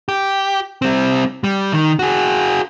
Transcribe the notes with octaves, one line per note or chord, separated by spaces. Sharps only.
G4
G3 C4
G3
D#3
F#4 G#4